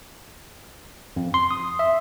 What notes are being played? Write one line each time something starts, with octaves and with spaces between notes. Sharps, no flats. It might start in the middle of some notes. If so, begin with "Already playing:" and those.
F2
C6
D#6
E5